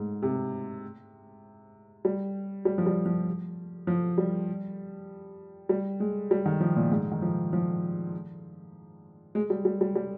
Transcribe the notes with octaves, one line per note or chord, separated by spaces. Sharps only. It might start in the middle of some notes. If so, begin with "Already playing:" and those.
Already playing: G#2
C3
G3
G3
F3
G3
F3
F3
G3
G3
G#3
G3
D#3
F3
A#2
G#2
D#3
F3
F3
G#3
G3
G3
G3
G3